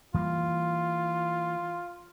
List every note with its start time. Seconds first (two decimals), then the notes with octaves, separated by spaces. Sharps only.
0.14 E3 G3 A#3 F4